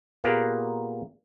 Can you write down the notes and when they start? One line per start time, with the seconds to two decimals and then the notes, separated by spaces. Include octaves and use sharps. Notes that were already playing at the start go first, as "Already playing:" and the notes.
0.24 A#2 A#3 B3 G4 G#4 F5